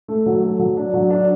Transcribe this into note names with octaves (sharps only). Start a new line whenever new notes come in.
A3
F#3
A3
F#3
D4
F#3
D4